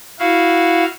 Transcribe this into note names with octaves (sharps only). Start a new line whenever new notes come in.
E4 F#4 F5